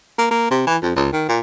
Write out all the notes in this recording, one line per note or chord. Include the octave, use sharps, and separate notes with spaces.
A#3
A#3
C3
E3
F2
C#2
D#3
A#2